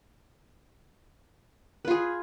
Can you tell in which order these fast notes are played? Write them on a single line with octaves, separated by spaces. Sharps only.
B4 F4 G#4